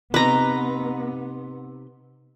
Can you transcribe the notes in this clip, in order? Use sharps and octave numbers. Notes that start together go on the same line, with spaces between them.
C3 B3 D#4 B4 A#5